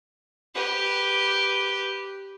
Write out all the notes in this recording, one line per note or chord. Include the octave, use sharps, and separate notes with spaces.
G4 B4